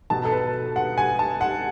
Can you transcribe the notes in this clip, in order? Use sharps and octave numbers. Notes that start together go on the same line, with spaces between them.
B2 F#3 A5
A4
B4
F#5
G#5
A5
F#5